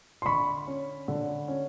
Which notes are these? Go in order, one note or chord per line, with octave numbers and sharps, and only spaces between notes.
C6
D3 B5 C#6
C#4
D3
C#4